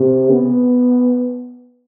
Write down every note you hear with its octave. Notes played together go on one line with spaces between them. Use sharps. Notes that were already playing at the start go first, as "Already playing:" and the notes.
Already playing: C3
B3